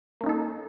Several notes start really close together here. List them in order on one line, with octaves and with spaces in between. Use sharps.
A#3 C#4 D#4 A4